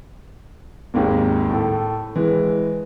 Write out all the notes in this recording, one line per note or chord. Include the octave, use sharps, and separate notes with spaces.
G#1 D#2 G#3 A#3
A2 A4
E3 G#3